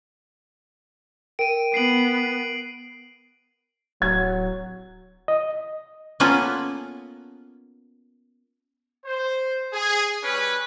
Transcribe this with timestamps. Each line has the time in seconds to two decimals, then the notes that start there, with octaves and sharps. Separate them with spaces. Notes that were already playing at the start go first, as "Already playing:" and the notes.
1.39 A#4 G5 D7 D#7
1.74 B3 C7 D7 F#7
4.02 D1 F#3 G#6
5.28 D#5
6.20 A#3 B3 C#4 F4 A4 B4
9.06 C5
9.73 G#4
10.24 G3 C#4 B4